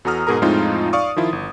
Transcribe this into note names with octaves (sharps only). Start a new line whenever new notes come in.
E2 F#4 A4 A#5 D#6 F6
G#2 B2 G#4 A#4 A#5
F2 A2 G#3 C4 D#4 F4
D5 F5 C#6 D#6
D#3 F3 E4 F4
G1